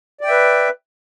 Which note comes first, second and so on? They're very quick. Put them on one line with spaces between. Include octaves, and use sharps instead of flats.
D5 G5 E5 B4